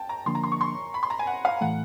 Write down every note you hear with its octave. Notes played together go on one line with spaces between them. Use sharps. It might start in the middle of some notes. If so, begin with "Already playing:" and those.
Already playing: G5 A5
A#5
D3 F3 A#3 D4 C6
A#5
C6
C#6
C6
B5
C6
A#5
G#5
F#5
F5
A2 E3 A3 F#5